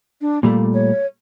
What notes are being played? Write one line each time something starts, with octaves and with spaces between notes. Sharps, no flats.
D4
A#2 G3 A3 A#3
C#5